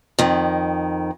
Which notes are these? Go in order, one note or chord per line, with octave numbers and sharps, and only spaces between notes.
F2 D#3